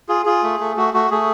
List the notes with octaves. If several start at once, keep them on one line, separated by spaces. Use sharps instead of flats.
F4 G#4
F4 G#4
A3
A3
A3 F#4
A3 F#4
A3 G#4